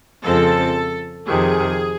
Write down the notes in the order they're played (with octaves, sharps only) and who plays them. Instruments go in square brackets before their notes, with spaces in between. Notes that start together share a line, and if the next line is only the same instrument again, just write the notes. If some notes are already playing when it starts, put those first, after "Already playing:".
[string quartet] F2 C#3 F3 G#3 C4 [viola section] A4
[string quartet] F2 C3 D#3 [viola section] G#4